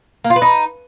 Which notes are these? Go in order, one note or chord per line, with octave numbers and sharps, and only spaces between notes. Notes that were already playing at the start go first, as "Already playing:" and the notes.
A#3
F4
B4
D#4